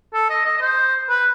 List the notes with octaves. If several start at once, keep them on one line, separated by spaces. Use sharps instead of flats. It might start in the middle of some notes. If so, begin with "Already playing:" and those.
A4
D#5
D#5
D#5
C5
B4